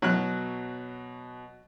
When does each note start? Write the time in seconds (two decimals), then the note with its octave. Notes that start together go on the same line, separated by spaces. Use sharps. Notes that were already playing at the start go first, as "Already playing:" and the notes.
0.02 B2 F#3 F#6